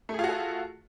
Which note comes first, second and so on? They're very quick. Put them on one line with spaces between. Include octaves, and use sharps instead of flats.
A3 G#4 F4 F#4 A4